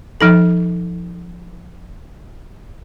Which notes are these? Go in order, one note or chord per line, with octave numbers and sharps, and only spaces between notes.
F3 D#4 A4